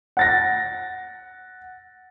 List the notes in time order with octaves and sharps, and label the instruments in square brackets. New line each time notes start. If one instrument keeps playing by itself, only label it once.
[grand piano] F#5 A6 A#6